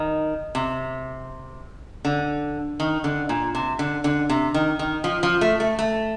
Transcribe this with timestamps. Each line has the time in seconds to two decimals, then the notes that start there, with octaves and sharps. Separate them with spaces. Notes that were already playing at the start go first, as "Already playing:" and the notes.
Already playing: D#3
0.55 C3
2.05 D3
2.80 D#3
3.04 D3
3.29 A#2
3.55 C3
3.79 D3
4.04 D3
4.30 C3
4.54 D#3
4.79 D#3
5.04 F3
5.23 F3
5.41 A3
5.60 A3
5.79 A3